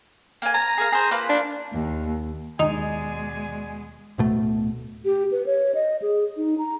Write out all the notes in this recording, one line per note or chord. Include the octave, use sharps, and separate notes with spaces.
A#3 G#5
G#5 A#5
G#4 A#4 F5
G#4 C5
A#3 F4 B4
D4
D#2
D#2 B2 G#3 D#4 D5 G#5
D1 B2 A3
G4
B4
C#5
D#5
G#4
D#4
A#5